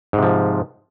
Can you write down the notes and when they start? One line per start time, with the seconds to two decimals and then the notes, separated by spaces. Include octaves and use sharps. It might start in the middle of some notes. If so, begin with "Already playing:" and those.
0.13 G#2
0.18 C3
0.23 F3